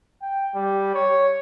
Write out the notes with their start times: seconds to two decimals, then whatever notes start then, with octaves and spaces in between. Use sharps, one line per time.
0.22 G5
0.55 G3
0.94 C#5